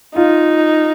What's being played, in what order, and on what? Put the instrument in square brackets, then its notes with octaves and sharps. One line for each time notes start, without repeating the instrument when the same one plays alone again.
[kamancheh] D#4 [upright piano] F4